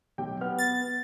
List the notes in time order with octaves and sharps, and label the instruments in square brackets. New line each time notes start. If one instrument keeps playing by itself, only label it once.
[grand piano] B1 G4 G5
[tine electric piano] B3 [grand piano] F6
[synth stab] A6